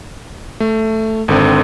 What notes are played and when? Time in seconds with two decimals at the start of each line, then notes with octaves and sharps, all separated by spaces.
0.60 A3
1.28 G#1 D3 C4